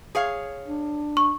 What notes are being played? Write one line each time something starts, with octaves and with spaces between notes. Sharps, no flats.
G#4 C#5 F5
D4
C#6